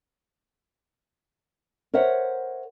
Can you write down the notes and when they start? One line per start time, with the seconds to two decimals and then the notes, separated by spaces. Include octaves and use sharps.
1.94 A#4 C5 C#5 E5 F#5